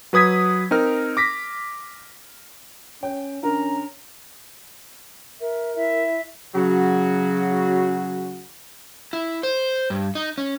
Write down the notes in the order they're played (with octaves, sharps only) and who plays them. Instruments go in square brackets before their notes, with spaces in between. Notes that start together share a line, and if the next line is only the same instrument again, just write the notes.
[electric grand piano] F#3 B4 D#6 G#6 B6
C4 D#4 A#4 F6
D6 A#6 B6
[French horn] C#4 [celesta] C#5 [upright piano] G5
[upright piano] D3 A#4 [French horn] C#4 [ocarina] A#5
[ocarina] A#4 [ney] E5
[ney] E4 [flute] E5
[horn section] C#3 F#3 F#4
[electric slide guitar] E4
C5
G2
D#4
C#4